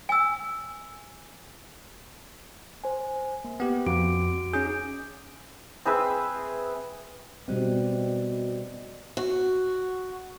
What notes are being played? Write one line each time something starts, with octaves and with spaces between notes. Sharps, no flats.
G#5 E6
C5 G#5
A#3
B3 G4
F2 F#4 D6 D7
C#4 D#4 G#4 G6 D7
C4 G#4 B4 E5
B2 G3 C4 F#4 D#5
F#4